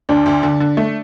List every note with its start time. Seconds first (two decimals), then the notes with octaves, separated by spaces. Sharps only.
0.09 D2 D4
0.26 D2
0.43 D3
0.60 D3
0.77 A3